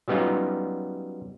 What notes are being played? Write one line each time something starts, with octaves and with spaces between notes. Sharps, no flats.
F#3 G3 B3 C#4 D#4 F4